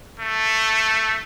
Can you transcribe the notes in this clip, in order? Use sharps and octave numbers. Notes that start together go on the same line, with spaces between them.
A3